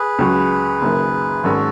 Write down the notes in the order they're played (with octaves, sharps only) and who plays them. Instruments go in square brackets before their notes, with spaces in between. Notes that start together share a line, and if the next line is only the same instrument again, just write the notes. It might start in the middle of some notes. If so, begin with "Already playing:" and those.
Already playing: [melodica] G#4 B4
[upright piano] C#2 C#3 F#3 C#4 F#4
F#1 F#2 D#3
[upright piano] G#1 G#2 D#3 G#3 C#4 [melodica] F#4 A4